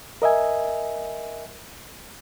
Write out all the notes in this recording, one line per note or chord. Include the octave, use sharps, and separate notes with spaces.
A#4 D#5 E5 G#5